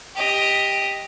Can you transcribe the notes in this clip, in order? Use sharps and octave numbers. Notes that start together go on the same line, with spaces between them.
G4 D#5